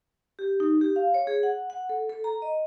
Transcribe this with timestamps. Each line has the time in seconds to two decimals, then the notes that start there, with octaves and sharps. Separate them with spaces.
0.39 G4
0.60 D#4
0.81 G4
0.96 F5
1.14 C#5
1.27 G#4
1.43 F#5
1.70 F#5
1.89 A4
2.10 A4
2.24 A#5
2.42 D#5